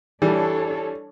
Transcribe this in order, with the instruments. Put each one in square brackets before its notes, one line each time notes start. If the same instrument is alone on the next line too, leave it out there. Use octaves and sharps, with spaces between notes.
[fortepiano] E3 G3 [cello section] D4 A4 C#5